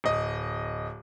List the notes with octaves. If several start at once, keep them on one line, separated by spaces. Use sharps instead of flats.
D1 D#5